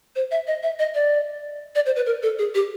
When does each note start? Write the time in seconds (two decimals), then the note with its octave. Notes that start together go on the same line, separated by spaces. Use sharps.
0.16 C5
0.31 E5
0.47 D#5
0.63 E5
0.79 D#5
0.95 D5
1.75 D5
1.86 C5
1.96 B4
2.06 A#4
2.23 A4
2.39 G#4
2.55 G4